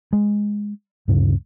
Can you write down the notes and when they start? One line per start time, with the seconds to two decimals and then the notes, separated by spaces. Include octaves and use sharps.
0.13 G#3
1.08 D2 G2 C#3